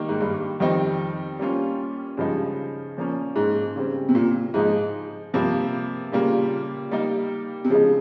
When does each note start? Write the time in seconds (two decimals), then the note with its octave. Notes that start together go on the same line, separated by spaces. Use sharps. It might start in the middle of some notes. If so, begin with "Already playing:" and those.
Already playing: D#3 G3 A#3 D#4
0.09 G#2
0.21 G2
0.60 F2 D#3 G3 C4 D#4
1.39 G3 A#3 C#4 F4
2.17 G2 C#3 F3 G#3 D#4
2.97 A#2 F3 A#3 C#4
3.36 G#2
3.76 C#3 G3 C4
4.09 C3
4.15 A#2
4.54 G#2 F3 G#3 D#4
5.34 G2 C3 F3 A#3
6.12 A#2 C#3 G3 A#3 F4
6.91 G3 A#3 D#4
7.65 C3
7.70 C#3 F3 G#3 D#4